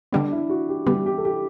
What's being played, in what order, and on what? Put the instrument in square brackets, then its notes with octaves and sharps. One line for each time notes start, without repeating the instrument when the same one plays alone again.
[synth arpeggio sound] D3 G3 B3 [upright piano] D4
[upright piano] E4
F#4
G4
[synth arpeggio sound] D3 G3 B3 [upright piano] G4
[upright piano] G4
A4
G4